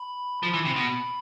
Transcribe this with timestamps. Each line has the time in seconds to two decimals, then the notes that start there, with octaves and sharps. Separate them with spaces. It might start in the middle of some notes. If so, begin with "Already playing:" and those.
Already playing: B5
0.43 F3 B5
0.54 E3
0.65 C3
0.76 B2